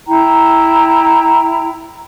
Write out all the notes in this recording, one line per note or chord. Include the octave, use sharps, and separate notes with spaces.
E4 G5 A#5